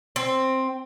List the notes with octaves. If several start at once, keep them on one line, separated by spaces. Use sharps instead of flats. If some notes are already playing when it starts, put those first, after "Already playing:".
C4